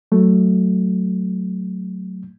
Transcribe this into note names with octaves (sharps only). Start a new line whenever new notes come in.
F#3 A3